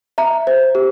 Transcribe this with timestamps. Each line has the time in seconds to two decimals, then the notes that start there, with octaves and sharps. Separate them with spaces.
0.18 E5 A#5
0.47 C5
0.75 G4